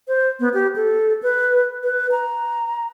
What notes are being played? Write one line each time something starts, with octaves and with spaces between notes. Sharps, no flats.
C5
B3
G4
A4
B4
B4
A#5